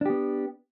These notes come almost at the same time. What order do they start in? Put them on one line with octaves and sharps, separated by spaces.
D4 G4 B3